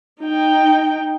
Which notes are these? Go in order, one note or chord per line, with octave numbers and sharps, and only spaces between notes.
D#4 G5